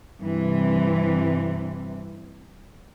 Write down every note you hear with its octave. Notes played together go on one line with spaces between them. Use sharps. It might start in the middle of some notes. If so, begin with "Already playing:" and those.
G2 C3 E3